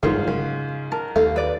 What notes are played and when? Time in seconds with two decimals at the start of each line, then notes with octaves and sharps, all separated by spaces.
0.03 G1 F2 G#2 C#3 A#3 F4 F5
0.28 F#2 C#3
0.92 A#4 A5
1.16 D#2 A3 F5
1.36 B4 D5